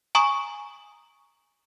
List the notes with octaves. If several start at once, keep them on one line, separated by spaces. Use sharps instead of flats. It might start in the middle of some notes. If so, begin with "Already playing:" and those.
G#5 A#5 C#6 D#6